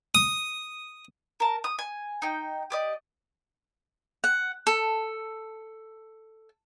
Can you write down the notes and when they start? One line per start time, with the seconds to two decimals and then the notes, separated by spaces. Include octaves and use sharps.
0.15 D#6
1.40 A#4 A5
1.64 D#6
1.79 G#5
2.22 D#4 G5
2.70 G4 D5 D#5
4.24 F#5
4.67 A4